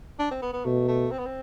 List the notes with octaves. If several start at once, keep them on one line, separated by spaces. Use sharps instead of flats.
D4
C4
B3
B3
B2 A3
A3
C4
B3
C4